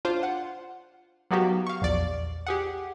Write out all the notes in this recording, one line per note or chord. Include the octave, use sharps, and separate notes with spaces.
D4 F4 C5
F#5
F#3 A#3 B3 D#4 F#4 G4
F5 C#6
A#1 E2 D5
G4 G#4 F#5